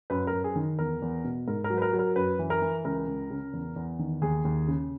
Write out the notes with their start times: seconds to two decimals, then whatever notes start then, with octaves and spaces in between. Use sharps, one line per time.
0.10 F#2 B4
0.27 A#4
0.33 F#2
0.44 G#4
0.56 D#3
0.79 E2 A#4
1.02 E2
1.24 B2
1.48 G#2 A#4
1.64 A#4
1.70 F#3
1.78 B4
1.82 A#4
1.93 F#3
1.99 A#4
2.16 F#2 B4
2.39 E3
2.50 A#4
2.62 E3
2.85 C#2 A#4
3.07 C#2
3.30 C#3
3.53 E2
3.76 E2
3.99 D#3
4.22 D#2 G#4
4.45 D#2
4.68 C#3